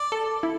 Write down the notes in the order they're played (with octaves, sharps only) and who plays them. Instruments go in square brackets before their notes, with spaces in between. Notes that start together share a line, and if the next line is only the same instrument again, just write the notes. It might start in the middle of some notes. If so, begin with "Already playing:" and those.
Already playing: [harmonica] D5
[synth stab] A4
E4